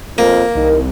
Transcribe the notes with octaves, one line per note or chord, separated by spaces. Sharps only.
F2 A#3 A#4
C2 D#3